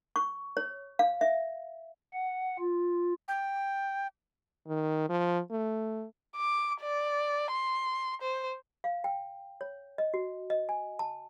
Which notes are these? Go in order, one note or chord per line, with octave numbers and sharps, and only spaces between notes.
C#6
C#5
F5
E5
F#5
F4
G5
D#3
F3
A3
D6
D5
C6
C5
F5
G5
C#5
D#5
F#4
D#5
G#5
A5